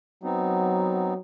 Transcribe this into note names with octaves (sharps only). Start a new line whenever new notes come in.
F#3 B3 C4 D#4